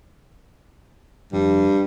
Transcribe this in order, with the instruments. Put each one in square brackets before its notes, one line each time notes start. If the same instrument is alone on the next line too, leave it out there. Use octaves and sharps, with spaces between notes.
[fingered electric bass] F1 [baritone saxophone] G2